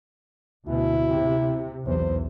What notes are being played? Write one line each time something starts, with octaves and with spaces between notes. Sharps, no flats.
D2 B2 E4
C3
B1 E2 C5